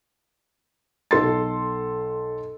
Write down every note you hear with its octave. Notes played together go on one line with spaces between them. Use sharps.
B1 A4 C6 A6